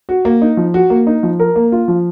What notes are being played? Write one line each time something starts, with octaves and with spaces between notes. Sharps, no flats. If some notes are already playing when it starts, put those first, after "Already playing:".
F#4
A#3
D#4
F3
F#4
A#3
D#4
F3
A#4
A#3
F4
F3